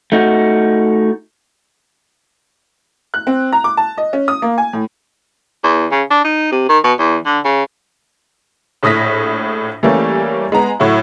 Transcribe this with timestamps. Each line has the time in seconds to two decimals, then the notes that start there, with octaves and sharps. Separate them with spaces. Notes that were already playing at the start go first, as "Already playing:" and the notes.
0.12 A3 D#4 F#4
3.14 F#6
3.27 C4
3.53 A#5
3.64 D6
3.77 A5
3.98 D#5
4.13 C#4
4.28 D#6
4.42 A#3
4.58 G#5
4.73 A2
5.64 E2
5.91 C#3
6.10 D4
6.24 D#4
6.52 C3
6.69 D#3
6.84 B2
6.99 E2
7.26 D3
7.45 C#3
8.83 A#1 A2 D#6 A#6 B6
9.83 E3 G3 A3 A#3 C#4
10.52 G#3 B3 A#5
10.80 A2 F#3 E4 F#4